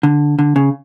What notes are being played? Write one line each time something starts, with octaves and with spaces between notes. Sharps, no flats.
D3
D3
C#3